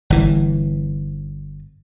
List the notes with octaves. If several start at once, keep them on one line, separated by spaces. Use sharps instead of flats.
G1 E3